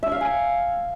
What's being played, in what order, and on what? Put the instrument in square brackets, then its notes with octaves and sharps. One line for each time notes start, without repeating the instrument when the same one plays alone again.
[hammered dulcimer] E5
F5
G#5